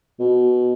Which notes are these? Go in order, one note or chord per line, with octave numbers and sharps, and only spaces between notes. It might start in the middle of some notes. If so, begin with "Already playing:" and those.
B2